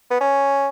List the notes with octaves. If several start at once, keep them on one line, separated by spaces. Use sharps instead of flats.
B3
C#4